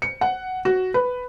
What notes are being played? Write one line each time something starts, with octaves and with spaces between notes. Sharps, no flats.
C#7
F#5
F#4
B4